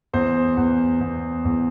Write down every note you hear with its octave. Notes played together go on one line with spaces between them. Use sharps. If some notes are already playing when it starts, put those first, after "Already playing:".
E2 C5
E2
E2
E2